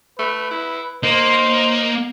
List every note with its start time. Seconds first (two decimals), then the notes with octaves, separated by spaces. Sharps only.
0.19 A3 B4
0.51 E4
1.03 A#3 D#4 C5